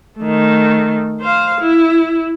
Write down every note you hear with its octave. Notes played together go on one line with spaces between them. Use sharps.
D#3 A3
C5 F5
E4